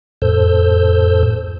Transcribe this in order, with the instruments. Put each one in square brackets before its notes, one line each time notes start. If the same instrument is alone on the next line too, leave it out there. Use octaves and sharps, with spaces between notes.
[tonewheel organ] F2 A2 A4 C5 E6 G6